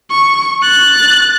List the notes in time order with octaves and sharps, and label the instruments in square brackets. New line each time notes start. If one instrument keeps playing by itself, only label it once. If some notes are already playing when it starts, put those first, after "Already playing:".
[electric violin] C#6
F#6 A6